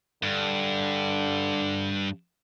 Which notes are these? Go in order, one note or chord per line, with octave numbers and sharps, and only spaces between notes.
G2 D3